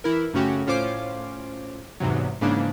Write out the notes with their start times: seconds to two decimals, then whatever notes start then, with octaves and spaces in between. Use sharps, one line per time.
0.04 E3 E4 A#4
0.33 F#2 C#3 A3 C#4 F#4 G4
0.67 A2 C#4 F4 C5 D6 C7
2.00 E2 G#2 C3 F#3
2.41 G#2 C#3 E3 A#3 D4